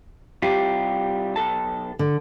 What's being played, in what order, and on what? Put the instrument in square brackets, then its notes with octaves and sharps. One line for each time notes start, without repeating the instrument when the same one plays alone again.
[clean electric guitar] C3 G3 F4 [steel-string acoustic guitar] G4
[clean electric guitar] B1 A4 A5
[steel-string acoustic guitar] D3